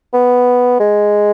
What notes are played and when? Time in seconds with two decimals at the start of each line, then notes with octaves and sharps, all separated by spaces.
0.13 B3
0.80 G#3